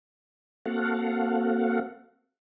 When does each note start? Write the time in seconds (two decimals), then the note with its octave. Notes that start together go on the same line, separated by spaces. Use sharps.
0.66 A#3 C4 F#4 A4 F5 F#5